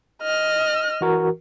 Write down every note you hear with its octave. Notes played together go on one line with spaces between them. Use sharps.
D#5 F6
E3 F#4 A#4